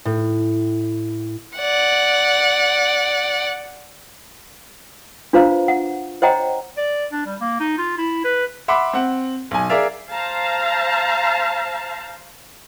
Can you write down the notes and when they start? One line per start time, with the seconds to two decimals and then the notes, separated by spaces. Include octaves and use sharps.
0.05 A2
1.58 D5 F#5
5.33 D4 F4 B4 C5 F5 A#5
5.68 F#5
6.22 C5 C#5 D#5 F#5 G5 A#5
6.77 D5
7.12 D4
7.26 G3
7.41 A#3
7.60 D#4
7.78 F4
7.97 E4
8.25 B4
8.68 E5 F#5 B5 C6 D6
8.93 C4 F#5
9.51 B1 G#5
9.69 G#4 A#4 D5 E5 F5
10.12 C5 F5 A5 A#5